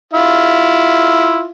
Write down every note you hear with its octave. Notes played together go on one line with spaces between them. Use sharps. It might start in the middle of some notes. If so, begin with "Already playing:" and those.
E4 F4 F5